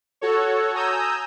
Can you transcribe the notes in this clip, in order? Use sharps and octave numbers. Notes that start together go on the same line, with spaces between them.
F#4 A4 C#5
G#5 A#5 D#6 E6 G6